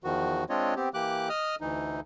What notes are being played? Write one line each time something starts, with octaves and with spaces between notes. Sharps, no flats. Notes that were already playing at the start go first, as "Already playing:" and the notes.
E2 D#3 F3 F#4
G#3 C4 D4 F4 C#5 D#5
B3 C4 G4
E3 A#3 G4 D6 F#6
D#5 D#6 F6
D2 E3 D#4